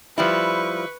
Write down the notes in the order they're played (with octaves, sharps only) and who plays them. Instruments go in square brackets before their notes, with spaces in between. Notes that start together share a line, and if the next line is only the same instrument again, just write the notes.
[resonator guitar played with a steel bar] F3 G3 E4 [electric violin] B4 C#6